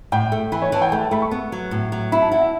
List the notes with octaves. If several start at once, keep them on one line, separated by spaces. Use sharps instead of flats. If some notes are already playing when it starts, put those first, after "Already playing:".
A2 G5
A3
E3 B5
C#5
E3 A5
G5
A3 G5
A5
A3 B5
C#6
B3
F#3
A2
F#3
E4 B5
A5
E4 F#5
E5